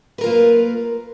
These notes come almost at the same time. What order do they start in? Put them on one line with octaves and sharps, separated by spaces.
B4 A#4 F4 A#3